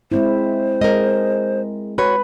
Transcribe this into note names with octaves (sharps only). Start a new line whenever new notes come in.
G#3 C4 E4 C5
G#3 A#4 D#5
F#4 B4 C#5